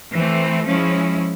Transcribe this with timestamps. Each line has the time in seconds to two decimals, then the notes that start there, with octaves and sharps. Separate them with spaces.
0.15 E3 A3 C4
0.67 F3 G#3 C#4 E4